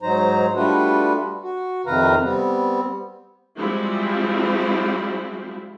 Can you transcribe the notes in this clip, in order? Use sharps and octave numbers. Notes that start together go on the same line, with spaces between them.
G#2 F#3 D#4 C5 A#5
G3 A3 D4 F4 F#4 B4
F#4
F2 C3 D#3 B4 F5 A#5
G3 B3 C4
F3 G3 G#3 C4 E4 F#4